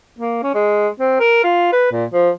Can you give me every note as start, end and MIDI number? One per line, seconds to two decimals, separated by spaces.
0.19 0.39 58
0.43 0.52 61
0.55 0.88 56
1.00 1.19 60
1.20 1.42 70
1.44 1.71 65
1.73 1.88 71
1.92 2.05 46
2.13 2.30 53